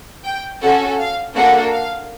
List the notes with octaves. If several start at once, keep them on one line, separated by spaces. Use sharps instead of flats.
G5
C#4 F#4 A4 F#5
F5
A#3 D4 F#4 A4 F#5
F5